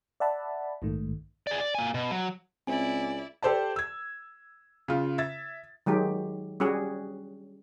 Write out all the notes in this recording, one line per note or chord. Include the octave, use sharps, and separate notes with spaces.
D5 E5 F#5 A5 B5
A#1 G#2 D#3 A3
G#4 D5
D5
A#3 G#5
B2
F#3
C#2 C4 E4 D5 G#5
G4 A4 C5 D5 A5
E6 G#6
C#3 F4
E5 G#6 A6
D#3 F#3 G#3 G4
G3 C#4 F#4 G#4